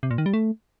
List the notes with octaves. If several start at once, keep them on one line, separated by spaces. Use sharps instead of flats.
C3
A#2
D#3
G3
A3